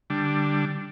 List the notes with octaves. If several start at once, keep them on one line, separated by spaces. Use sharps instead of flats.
D3 G3 D4